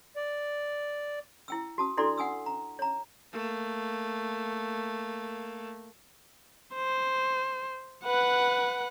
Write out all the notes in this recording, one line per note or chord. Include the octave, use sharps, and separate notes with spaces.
D5
E4 G5 E6
F#4 A5 D#6
D4 E4 F#4 A4 D5 C6
F#5 G#5 D#6 E6
A#5
C#5 A#5
A3 A#3
C5
B4 F#5